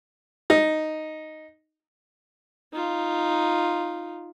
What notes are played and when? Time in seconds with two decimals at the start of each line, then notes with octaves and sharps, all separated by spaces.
0.50 D#4
2.73 D#4 F4